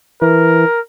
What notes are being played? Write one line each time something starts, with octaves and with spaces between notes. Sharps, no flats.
E3 A#4